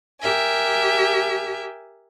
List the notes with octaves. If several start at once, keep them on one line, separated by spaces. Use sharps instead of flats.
G4 A#4 E5 G#5